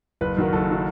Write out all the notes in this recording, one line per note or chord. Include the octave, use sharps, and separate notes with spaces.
F#1 B4
F#2 D#3 F#3 A#4
F#1 A4
D#3 F#3